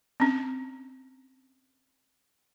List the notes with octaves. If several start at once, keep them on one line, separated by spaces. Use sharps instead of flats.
C4 C#4